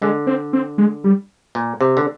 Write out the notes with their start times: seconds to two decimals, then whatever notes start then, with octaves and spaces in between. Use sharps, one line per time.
0.02 D3 G#3
0.27 C4
0.53 C4
0.78 G#3
1.04 G3
1.55 A#2
1.81 C3
1.97 D3